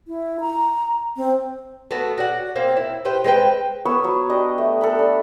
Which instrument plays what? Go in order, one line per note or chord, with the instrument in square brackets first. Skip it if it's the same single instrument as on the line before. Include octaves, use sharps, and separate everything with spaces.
[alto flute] E4
A#5
C4
[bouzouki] A3 B3 F#4
F#4 D5 F#5
A#3 C4 F5
E4
G4 B4 C5 G5
G#3 C4 B4 G5
[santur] B3 B4 C#5 E6
F#3
D4 G4 D#5
A3
A4 F#5 B5
D4